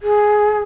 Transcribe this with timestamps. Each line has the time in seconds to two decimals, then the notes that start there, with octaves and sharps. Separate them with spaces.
0.02 G#4